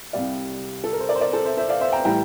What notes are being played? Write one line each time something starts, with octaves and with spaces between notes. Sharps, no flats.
C2 C3 G3 D5 F5
A4
A#4
C5
A#4 D5
C5
A#4 D5
A4 C5
C5 E5
C5 E5
D5 F5
C5 E5
G5 A#5
A2 E3 G3 G5 A#5